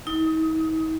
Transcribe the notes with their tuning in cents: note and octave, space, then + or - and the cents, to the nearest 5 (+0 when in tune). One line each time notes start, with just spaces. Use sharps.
D#4 +45 D#6 +20